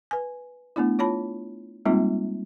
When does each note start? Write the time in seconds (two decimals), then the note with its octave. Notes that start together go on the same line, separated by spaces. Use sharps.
0.11 B4 G#5
0.76 A3 B3 D4 E4
0.99 F4 C#5 A5 B5
1.85 G3 G#3 A#3 C4 D#4 F4